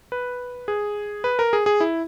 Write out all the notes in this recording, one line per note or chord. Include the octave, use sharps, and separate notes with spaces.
B4
G#4
B4
A#4
G#4
G#4
E4